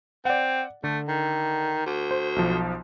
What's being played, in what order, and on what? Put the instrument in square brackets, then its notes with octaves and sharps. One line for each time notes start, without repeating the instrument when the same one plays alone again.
[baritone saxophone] C4 [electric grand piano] D5 F#5
[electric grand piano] D3 [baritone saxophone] A3
[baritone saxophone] D#3
D2
[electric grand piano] C5
B1 F3